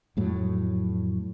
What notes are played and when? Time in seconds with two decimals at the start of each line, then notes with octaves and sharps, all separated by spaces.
0.17 F2 A2 F#3